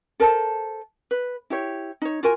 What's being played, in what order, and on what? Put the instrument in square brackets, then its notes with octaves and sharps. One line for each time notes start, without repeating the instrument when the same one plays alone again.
[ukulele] A4 A#4 C5 A5
B4
E4 G4 C#5
D#4 C#5
F4 F#4 A#4 G#5